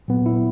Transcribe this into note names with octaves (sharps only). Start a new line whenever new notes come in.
A#2 F#3 B3
E4